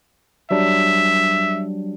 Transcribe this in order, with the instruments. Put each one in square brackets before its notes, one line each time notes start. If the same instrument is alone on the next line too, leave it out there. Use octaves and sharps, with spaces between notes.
[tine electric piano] F#3 G3 D4 [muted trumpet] E5